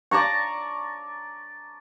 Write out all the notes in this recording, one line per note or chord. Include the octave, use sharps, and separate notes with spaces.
D5 A5 A#5 C#6